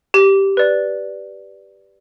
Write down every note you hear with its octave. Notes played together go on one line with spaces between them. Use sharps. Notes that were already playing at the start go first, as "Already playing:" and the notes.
G4
B4 D5